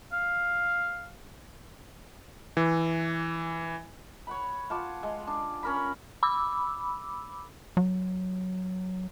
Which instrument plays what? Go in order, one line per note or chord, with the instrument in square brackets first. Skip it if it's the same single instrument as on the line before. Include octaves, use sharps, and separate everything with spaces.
[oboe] F5
[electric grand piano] E3
[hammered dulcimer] C#5 F#5 B5
F4 F#5 A5 D6
G#3
D4
C#4 A#4 B5
[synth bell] B5 D6 E6
[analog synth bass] F#3